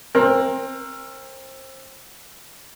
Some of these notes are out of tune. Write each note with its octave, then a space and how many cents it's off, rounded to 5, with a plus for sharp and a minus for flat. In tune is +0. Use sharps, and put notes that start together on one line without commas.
C4 +30 A#4 +0